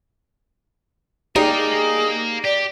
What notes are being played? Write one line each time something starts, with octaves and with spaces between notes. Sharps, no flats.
D#4 G4 G#4 A#4 D5 F5
G#4
G4 D5